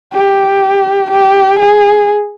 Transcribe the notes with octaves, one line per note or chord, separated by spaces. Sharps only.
G4
G4
G#4